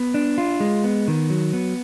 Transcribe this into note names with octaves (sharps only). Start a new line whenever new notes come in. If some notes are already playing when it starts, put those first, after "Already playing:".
Already playing: B3
D4
F4
G#3
B3
D#3
F#3
B3